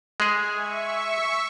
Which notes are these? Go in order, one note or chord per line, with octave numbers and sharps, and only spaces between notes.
G#3 G#4 G#5
E5 C#6